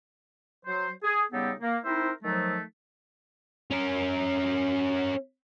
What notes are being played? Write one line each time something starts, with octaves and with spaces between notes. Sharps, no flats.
F#3 C5
G#4
C#3 G3 B3 D#4 G4 A4
A#3
C4 D#4 E4 A#4 C5 E5
D#3 F3 F#3 A3
C#4 A#4